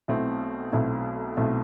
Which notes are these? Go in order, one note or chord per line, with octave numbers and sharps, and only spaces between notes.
B1 B2 A3 C4 E4
B1 B2 A3 C4 E4
B1 B2 A3 C4 E4